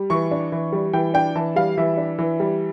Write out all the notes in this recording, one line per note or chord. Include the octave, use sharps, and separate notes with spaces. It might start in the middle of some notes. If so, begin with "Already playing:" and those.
Already playing: G3
E3 C#6
D4
E3
G3
E3 G5
D4 G5
E3 A5
G3 F5
E3 E5
D4
E3
G3